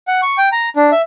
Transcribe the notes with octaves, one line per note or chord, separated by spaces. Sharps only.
F#5
C#6
G5
A#5
D4
E5